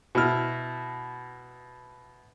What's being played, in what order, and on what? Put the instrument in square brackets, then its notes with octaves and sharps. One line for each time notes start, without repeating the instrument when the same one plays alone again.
[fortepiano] B2 E4 F6